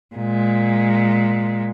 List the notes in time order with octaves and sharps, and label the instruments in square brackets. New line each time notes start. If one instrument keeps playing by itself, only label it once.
[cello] A#2 G#3